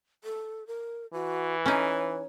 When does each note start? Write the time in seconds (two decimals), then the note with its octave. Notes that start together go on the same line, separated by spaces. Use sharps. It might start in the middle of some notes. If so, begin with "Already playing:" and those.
0.24 A4
0.67 A#4
1.13 E3 F#4
1.66 C#4 D#4 C#5